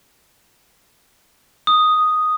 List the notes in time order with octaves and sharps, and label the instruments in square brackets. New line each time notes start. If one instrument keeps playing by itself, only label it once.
[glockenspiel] D#6